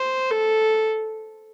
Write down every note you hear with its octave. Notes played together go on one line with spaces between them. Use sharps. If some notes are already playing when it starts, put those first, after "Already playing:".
Already playing: C5
A4